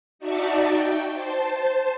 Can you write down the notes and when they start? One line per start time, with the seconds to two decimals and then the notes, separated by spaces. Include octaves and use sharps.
0.19 D#4 F#4 D5 E5 A5 C#6
0.63 G5
1.13 C5 A5